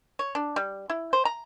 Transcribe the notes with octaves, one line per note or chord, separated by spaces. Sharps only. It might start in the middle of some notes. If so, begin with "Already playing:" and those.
C#5
D4
G3
E4
C5
A#5